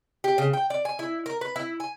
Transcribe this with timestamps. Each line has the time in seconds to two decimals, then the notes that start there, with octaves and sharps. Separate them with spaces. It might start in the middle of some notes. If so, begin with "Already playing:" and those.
0.24 G4
0.38 C#3
0.53 G5
0.70 D5
0.85 G#5
0.99 E4
1.26 A#4
1.41 B4
1.56 E4
1.80 G#5